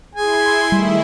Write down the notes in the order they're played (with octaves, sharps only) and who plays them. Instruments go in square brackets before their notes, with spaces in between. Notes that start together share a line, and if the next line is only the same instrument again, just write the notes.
[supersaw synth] E4 C6 [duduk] G#4 [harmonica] G#5
[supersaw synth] D#3 E4 G#4 [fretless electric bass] G3 [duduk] A3